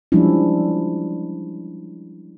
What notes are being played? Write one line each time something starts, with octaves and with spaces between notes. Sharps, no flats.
F3 G3 G#3 C#4 D4 E4